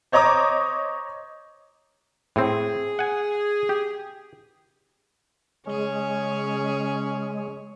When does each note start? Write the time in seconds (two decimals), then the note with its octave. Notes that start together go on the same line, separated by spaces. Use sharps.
0.12 C5 C#5 D#5 A#5 D6 D#6
2.36 A2 C4 G#4
2.99 F#5 G#5
3.69 G4
5.67 C#3 G#3 C#4 G#4 C#5